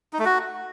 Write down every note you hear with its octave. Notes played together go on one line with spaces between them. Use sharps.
D#4
A3
F#4